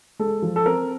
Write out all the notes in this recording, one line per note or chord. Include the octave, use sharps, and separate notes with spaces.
G#3 A4
F3
A4
C4 A#4